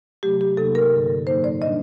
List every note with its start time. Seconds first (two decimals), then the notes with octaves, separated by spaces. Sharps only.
0.23 C3 F#3 A3 G4
0.41 G4
0.57 C3 F#3 A#3 D#4 A4
0.75 A#4
0.93 G2 D3 F#3
1.27 A2 F#3 A#3 D#4 C5
1.44 D5
1.62 A#2 G3 D4 D#5